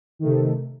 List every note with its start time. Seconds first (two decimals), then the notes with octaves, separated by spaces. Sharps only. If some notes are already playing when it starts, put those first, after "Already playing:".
0.19 D#3
0.23 A3
0.26 C3